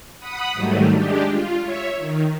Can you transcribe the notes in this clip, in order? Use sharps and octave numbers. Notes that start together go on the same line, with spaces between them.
F#5 B5 D#6
G#2 D#3 F#3 G3 A3
G#3 D4 G4
F4
C#5 E5
D#3